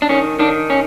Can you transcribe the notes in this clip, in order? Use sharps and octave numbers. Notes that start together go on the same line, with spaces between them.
D4
D#3 C#4
D#3 D4
C#4